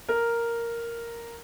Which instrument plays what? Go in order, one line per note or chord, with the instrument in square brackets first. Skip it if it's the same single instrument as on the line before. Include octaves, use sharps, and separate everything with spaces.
[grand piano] A#4